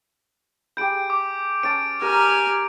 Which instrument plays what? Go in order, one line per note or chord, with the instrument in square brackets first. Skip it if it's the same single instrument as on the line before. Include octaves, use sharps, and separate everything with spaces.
[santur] G4 G#4 B5 [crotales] G6 D7
[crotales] D6
[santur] C#4 A5 [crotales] D7
[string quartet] G4 G#5 F6 [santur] A#4 A#5